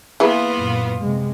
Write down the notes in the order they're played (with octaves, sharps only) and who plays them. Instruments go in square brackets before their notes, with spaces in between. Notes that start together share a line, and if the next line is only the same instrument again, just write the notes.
[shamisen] E3 G#4 B4 [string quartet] A#3 B3 F4
[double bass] F#2 A#2
C3 G#3